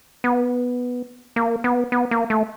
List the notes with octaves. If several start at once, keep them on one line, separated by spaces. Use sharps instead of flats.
B3
A#3
B3
B3
A#3
A3